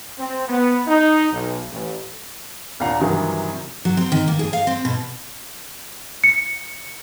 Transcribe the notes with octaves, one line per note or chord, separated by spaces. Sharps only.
C4
B3
D#4
B1
A1
D#2 A#2 D4 F5 F#5 A#5
G2 C3 D#3 E3 F#3
F#3
C4
D#3
A#3
G#4
F5
C4
B2
C#7